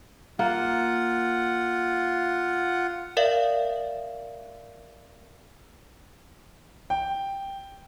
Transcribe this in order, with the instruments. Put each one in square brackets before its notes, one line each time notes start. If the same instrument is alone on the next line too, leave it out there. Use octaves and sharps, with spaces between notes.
[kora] A#3 [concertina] F4 F#5
[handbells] A#4 D5 E5 F5
[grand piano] G5